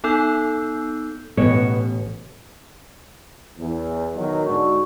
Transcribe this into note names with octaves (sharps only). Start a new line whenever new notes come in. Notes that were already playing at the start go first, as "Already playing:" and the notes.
B3 D#4 A4 E6 G6
A1 B2 B3 C#5
E2
B2 D#3 F#3 D#5
G#2 D3 F#4 C#6